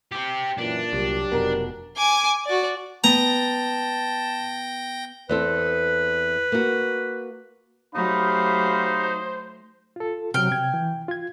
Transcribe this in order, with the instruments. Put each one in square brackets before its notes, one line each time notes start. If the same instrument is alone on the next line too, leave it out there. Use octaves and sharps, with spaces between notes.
[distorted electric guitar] C4 G4
[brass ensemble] F#2 E3 [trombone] A#2 [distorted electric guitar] D4
[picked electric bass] C2 [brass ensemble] F#3 G4
[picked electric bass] F1 B2 [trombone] A#4
[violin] G#5 D6
F#4 D5
[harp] B3 [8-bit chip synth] G5 G6 A#6 [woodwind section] A5 [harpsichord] A#5
[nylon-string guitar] E2 C4 A4 [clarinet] B4
[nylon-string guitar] A#3 F#4
[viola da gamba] F#3 A3 [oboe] D#4 [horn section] G4 F5 B5 [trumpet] C5
[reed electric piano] F4 A4
[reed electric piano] C3 F#3 [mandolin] G5 F6
[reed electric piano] C3 G#6
E3
F4 G#6